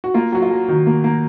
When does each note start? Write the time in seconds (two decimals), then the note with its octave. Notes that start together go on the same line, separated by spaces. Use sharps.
0.04 F#4
0.14 A#3 F4
0.32 F#3 F#4
0.42 F4
0.51 F#3
0.68 D#3 F#4
0.87 A#3
1.04 A#3